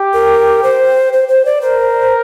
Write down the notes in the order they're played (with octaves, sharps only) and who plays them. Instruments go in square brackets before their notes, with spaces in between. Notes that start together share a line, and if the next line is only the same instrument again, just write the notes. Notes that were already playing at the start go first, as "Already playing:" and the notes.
Already playing: [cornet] G4
[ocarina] A#4
C5
C5
C5
D5
[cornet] A#4 [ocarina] C5